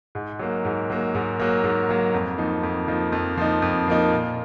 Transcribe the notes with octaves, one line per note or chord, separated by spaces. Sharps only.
G#2
F#3 A#3
G#2
F#3 A#3
G#2
F#3 A#3
G#2
F#3 A#3
F2
F3 A#3 D#4
F2
F3 A#3 D#4
F2
F3 A#3 D#4
F2
F3 A#3 D#4
A#2